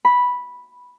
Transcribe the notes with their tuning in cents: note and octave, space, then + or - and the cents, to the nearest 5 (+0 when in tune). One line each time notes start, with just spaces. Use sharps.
B5 -5